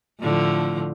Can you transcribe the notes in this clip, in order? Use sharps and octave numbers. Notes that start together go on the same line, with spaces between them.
A2 D3 F3